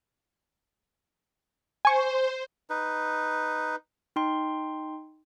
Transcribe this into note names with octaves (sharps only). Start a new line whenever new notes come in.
C5 G#5 C#6
D#4 B4
D#4 G5 C6